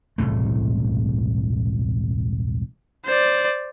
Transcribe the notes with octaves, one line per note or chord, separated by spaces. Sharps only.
E1 C2 A2 A3
C5 D5